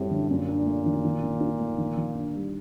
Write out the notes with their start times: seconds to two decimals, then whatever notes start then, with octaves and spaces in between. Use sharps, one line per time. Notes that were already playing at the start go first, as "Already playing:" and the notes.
Already playing: F#2 A2 G3 C4
0.11 D3
0.30 F#2 A#2
0.49 D4
0.66 A3
0.86 D#3
1.04 D#3
1.23 D#3
1.41 D#4
1.60 A3
1.78 D#3
1.96 D#3
2.15 D4
2.34 G3